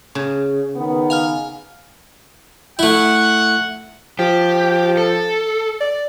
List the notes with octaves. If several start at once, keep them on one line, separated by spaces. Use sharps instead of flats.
C#3
D#3 B3
F5 G#5 F6
A3 E4 F#5
F3 G4
A4
D5